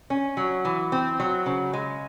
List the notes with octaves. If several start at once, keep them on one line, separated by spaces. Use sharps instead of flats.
C#4
F#3
E3
C4
F#3
C#3
G#3